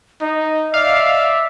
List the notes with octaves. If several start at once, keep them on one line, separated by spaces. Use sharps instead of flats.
D#4 D#5
D5 E5 F5